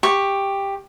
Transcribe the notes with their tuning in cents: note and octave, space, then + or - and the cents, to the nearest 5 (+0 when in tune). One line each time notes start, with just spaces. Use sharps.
G4 +10 C#6 +0